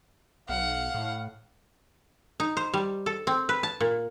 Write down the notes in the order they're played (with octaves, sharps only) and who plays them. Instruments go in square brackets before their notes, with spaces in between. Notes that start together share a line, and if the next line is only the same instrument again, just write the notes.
[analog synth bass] B1 [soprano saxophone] F5 [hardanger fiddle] F#5
[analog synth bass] A2
[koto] D#4
C5
G3
A4
C4
B4
A5
A#2